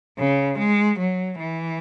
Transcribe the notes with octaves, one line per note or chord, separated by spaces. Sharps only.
C#3
G#3
F#3
E3